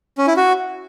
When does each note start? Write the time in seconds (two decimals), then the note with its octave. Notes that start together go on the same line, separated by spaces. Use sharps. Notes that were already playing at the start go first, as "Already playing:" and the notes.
0.18 C#4
0.27 E4
0.37 F#4